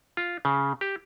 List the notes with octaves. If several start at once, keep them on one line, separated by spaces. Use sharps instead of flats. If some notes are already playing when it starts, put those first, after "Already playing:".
F4
C#3
G4